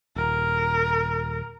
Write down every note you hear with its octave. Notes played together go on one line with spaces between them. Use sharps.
D#1 A#4